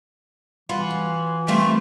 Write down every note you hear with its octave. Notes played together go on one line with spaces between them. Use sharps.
E3 G3 F4 F#4 B4
C#4
G3 A3 A#3 C4 E4 F4 A4